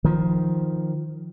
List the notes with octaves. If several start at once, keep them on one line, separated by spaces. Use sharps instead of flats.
D#3 F3